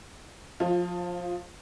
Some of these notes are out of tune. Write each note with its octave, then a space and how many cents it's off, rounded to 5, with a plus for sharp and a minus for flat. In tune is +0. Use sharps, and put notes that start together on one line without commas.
F3 +25 F4 +0